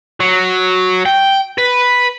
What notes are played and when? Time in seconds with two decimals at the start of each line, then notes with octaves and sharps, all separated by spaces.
0.20 F#3
1.06 G5
1.58 B4